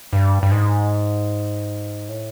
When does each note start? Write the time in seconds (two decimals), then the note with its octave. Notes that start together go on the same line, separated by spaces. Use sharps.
0.13 G2
0.43 G2
0.51 G#2
2.09 A2